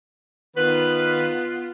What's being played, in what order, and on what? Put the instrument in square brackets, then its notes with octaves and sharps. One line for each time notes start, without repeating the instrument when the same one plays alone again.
[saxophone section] D#3 B4 [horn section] B3 F4